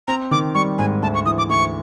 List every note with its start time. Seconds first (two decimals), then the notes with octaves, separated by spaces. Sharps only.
0.08 C4 A#5
0.31 D#3 D6
0.54 G3 C#6
0.78 G#2 G#5
1.02 D2 A5
1.14 C#6
1.26 E3 D#6
1.38 D6
1.49 D2 C#6